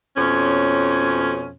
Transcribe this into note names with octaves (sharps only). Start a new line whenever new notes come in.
F2 B2 C#4